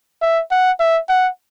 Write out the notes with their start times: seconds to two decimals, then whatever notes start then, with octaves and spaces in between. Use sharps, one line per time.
0.22 E5
0.51 F#5
0.80 E5
1.09 F#5